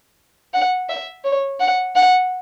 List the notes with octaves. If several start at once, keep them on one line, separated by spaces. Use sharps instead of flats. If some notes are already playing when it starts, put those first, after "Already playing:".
F#5
E5
C#5
F#5
F#5